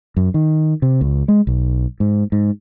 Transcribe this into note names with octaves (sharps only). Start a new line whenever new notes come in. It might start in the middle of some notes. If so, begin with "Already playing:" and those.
F#2
D#3
C3
C#2
G#3
B1
G#2
G#2